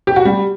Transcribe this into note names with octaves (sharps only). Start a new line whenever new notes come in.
G4
F#4
G3